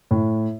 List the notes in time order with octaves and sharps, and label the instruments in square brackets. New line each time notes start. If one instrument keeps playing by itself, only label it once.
[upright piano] A2